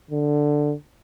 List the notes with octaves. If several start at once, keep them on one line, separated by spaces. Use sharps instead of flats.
D3